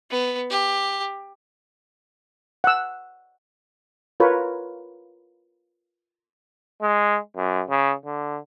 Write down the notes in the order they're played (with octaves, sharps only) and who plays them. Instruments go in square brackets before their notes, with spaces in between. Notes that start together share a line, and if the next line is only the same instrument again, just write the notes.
[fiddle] B3
G4
[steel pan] F#5 E6
F4 A#4 B4 C#5
[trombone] G#3
F#2
C#3
D3